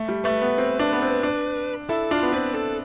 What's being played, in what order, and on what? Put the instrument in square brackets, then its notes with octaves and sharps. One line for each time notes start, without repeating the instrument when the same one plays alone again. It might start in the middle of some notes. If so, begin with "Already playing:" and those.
Already playing: [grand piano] A3
G3
[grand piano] A3 [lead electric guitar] B4
[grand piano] B3
C4
D4
B3
C4
D4
[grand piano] E4 [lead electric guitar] A4
[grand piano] D4 [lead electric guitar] F4
[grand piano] B3
[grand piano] C4 [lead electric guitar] B4
[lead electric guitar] A4